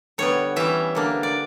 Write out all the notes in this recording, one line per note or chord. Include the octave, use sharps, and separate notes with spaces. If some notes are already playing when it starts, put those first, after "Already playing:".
D3 G3 B3 C#5
E3 G3 C#4 E5
D3 A#3 D4
D5